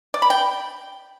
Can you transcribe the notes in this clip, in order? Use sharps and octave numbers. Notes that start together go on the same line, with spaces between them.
D5
B5
G5